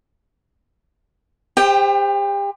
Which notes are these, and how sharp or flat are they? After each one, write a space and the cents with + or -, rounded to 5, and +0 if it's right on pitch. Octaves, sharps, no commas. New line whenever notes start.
G4 +35 C5 -5 G5 +0